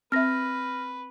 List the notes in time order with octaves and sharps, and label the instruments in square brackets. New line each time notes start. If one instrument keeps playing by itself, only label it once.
[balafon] C4 E5 [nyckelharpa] B4 [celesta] F6 A#6